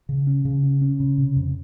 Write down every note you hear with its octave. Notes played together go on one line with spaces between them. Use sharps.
C#3
C#4
C#3
C#4
C#4
C#3
C3
F2